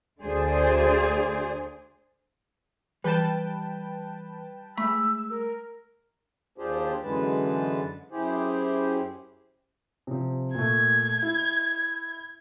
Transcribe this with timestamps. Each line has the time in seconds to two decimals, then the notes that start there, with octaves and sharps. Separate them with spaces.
0.22 D2 D3 G#4 C5 D5
3.04 E3 G3 B4 G5 A5
4.77 G#3 A3 B5 E6
5.30 A#4
6.58 D#2 D4 F4 G4 G#4 C5
7.03 F#2 D3 E3 G#3 B4 A5
8.11 F#2 E4 G4 G#4 C5
10.07 C3 F3
10.55 A#2 A3 G#6
11.23 E4